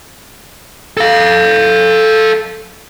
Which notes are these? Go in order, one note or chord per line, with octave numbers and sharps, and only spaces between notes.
A4 F5